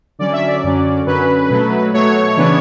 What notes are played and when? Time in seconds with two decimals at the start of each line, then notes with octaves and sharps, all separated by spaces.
0.19 D3 F#3 C#4 D5
0.33 E5
0.47 D5
0.63 F#2 D3 F#3 C#4
1.06 F#2 D3 F#3 C#4 B4
1.50 B2 F#3 A3
1.93 B2 F#3 A3 C#5
2.37 C#3 E3 B3 D4